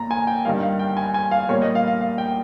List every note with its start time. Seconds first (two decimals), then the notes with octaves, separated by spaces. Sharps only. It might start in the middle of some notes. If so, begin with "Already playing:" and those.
Already playing: A#2 A#5
0.11 G#5
0.27 G5
0.45 G2 D#3 G3 F5
0.62 F5
0.79 G5
0.97 G#5
1.14 G#5
1.31 F5
1.49 A#2 G3 A#3 C#5
1.62 D#5
1.75 F5
1.87 F5
2.01 F5
2.18 G5